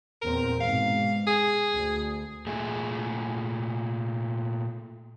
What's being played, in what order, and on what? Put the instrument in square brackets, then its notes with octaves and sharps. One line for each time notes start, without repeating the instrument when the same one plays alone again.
[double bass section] E2 A#2 C4 [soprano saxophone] A#4
[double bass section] G#2 B2 [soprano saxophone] F5
[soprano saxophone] G#4
[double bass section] D2
[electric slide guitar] A#2 A3 G#4